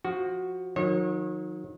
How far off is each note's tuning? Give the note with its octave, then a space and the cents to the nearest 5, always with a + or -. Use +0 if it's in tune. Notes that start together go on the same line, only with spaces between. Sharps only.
F3 +15 F#4 +0
D#3 +0 F#3 -35 C#5 -35